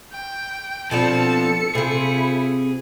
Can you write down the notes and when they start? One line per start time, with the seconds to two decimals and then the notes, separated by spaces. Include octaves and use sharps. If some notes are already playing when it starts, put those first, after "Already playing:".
0.12 G5
0.91 B2 F3 C4 D4 A4 A5 C#7
1.75 C3 E4 F4 G#4